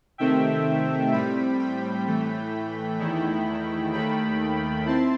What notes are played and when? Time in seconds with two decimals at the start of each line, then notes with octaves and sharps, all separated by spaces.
0.18 C3 D#3 A3 C4 E5 G5
1.12 A2 G3 C4 G5 B5
1.59 G5 B5
2.06 A2 E3 A3
2.99 E2 D#3 A3 E4
3.92 D#2 D#3 A3 G5 B5
4.86 C4 E4 A5 C6